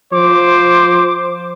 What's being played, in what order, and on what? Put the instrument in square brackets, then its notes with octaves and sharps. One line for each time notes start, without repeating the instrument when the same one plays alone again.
[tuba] F3 [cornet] C5 [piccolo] D6